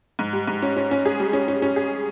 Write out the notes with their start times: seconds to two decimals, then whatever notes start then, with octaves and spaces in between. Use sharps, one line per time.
0.19 G#2
0.33 G3
0.48 G#2
0.62 C#4
0.77 C#4
0.91 C#4
1.06 G#4
1.20 G3
1.33 C#4
1.48 C#4
1.62 C#4
1.76 G#4